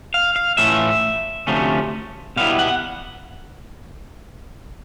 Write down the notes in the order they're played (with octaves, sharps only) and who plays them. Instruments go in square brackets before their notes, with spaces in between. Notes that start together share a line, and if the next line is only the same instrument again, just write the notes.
[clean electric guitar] F5
F5
A2 E3 A3 C#4 F4 E5
D2 C3 F3 A3 C#4
B2 G3 B3 E4 F5
F#5